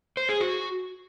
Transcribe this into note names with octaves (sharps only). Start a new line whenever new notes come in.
C5
G#4
F#4